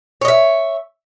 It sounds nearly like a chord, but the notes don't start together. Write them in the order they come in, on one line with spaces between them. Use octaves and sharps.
C#5 D#5 E5